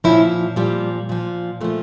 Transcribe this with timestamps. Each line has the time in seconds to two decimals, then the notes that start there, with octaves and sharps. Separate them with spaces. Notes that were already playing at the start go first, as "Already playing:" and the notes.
0.04 A#2 F3 C#4 E4
0.56 A#2 F3 G3
1.09 A#2 F3
1.61 A#2 F3 A3